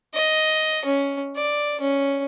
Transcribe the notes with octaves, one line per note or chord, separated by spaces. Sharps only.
D#5
C#4
D5
C#4